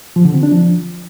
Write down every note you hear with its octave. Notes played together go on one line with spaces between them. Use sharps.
F3
D3
C4
D4
F3